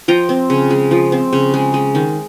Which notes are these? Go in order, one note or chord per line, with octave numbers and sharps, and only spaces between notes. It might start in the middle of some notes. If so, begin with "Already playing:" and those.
F3 G5 A#5
C4
C#3
G#3
F3
C4
C#3
G#3
G#3
D#3